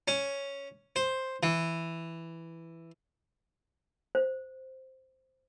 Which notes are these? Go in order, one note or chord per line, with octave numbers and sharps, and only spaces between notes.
C#4
C5
E3
C5